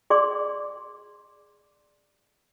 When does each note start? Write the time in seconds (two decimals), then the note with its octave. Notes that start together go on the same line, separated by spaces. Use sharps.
0.10 G#4 D5 C6 D6